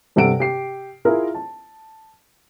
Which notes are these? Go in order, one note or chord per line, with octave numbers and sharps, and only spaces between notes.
G2 C3 A4 F#5 D7
G4 C7
E4 F4 G#4 A#4
A5